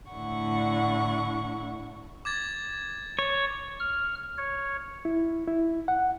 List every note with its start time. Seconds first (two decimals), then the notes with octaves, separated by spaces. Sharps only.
0.12 A2 D3 E4 F#5 C#6
2.25 D6 G#6 A6
3.19 C#5
3.80 F6
4.38 C#5
5.05 E4
5.47 E4
5.88 F#5